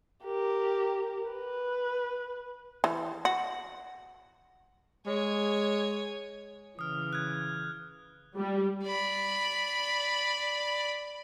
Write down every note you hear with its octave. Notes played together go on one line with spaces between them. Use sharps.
G4 A#4
B4
E3
F#4
G#3 C#5 G#5
C#3 E3 D#6 F6
F#6 G#6
G3
D5 B5